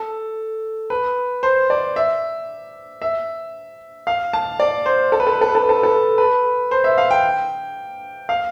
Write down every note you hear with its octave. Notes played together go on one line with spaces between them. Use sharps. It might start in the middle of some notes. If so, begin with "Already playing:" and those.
Already playing: A4
B4
C5
D5
E5
E5
F5
A5
D5
C5
A4
B4
A4
B4
A4
B4
A4
B4
A4
B4
A4
B4
C5
E5
F5
G5
F5